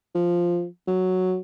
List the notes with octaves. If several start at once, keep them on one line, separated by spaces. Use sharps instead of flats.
F3
F#3